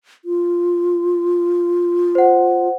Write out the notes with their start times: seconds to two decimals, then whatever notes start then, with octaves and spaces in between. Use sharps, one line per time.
0.25 F4
2.15 C5 F#5